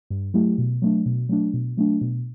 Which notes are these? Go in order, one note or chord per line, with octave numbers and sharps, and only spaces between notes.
G2
F#3 A3 E4 G4
B2
F#3 A3 D4
B2
F#3 A3 D4
B2
F#3 A3 D4
B2